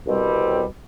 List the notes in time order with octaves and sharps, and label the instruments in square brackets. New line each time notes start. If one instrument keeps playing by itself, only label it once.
[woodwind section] C2 B2 G3 C4